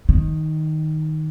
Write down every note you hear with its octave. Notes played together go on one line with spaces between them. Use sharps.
D#3